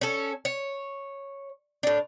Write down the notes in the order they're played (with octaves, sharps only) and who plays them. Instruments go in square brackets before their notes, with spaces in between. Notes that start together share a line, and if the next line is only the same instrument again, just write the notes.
[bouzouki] C#4 A4
C#5
A2 D4